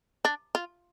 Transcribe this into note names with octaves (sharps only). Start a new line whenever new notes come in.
D4
F4